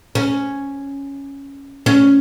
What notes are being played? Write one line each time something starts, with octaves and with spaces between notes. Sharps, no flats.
C#4
C#4